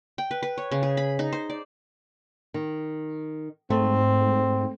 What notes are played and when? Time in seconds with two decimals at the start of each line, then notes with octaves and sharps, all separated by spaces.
0.18 G5
0.31 B4
0.43 B4
0.58 C#5
0.71 C#3
0.83 G#4
0.97 B5
1.19 D#4
1.33 C5
1.50 D5
2.54 D#3
3.70 G#2 A3 C4